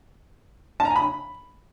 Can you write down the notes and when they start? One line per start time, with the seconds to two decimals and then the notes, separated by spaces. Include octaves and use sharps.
0.80 A5
0.85 A#5
0.90 G#5
0.96 B5